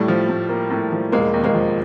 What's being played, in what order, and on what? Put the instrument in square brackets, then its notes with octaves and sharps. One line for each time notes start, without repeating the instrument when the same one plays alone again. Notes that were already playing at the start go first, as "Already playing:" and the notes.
Already playing: [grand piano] A2 [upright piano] G3 A3
[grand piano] F3
A2
A#3
A2
F3
[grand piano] E1 [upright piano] G#3 A#3
[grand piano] D#2
[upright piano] G#3 A#3
[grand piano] F3